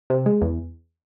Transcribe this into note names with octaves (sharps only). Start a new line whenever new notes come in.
C3
G#3
E2